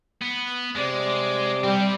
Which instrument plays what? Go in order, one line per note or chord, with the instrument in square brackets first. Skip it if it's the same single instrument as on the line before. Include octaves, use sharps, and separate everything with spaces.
[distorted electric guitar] B3
[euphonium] C3 [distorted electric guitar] G#3 [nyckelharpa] D5
[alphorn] G3 [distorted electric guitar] C4 G4